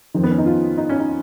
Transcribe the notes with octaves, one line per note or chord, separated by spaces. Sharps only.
F2 D#3
B3
C#4
D#4
F4
D#4
C#4
D#4